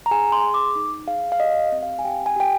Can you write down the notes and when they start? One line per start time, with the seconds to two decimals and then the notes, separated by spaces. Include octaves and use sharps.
0.06 A#5
0.11 G#4 G#5
0.32 C6
0.44 G#4
0.54 D6
0.76 D#4
1.08 G#4 F5
1.32 F5
1.40 G4 D#5
1.72 C4
1.83 F5
1.99 G#5
2.05 G4 G5
2.26 G#5
2.36 G4 G5